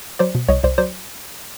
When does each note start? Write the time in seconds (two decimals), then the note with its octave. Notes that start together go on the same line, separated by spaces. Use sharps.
0.19 F#3 C5 D5
0.35 B2
0.48 C2 C#5 D#5
0.63 C2 C5 D5
0.78 F#3 C5 D5